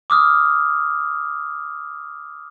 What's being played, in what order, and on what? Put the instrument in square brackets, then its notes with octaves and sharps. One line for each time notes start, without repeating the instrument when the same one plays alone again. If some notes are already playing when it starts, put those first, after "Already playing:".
[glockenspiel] D6 D#6 F6